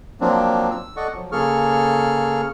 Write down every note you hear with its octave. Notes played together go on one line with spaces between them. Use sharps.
F3 F#3 A#3 C4 D4
E6
A4 D5 D#5 F#5 C#6
F3 F#3
C#3 A#3 G#4 A4 C#6 F6